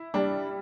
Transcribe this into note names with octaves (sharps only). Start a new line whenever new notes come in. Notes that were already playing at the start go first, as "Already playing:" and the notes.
Already playing: E4
G3 D4